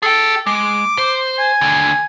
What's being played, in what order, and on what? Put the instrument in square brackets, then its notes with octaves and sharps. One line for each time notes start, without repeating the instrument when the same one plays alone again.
[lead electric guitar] G#4 G5 [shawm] A4
[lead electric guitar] G#3 [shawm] D6
[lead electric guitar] C5
[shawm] G#5
[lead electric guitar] D#2 D3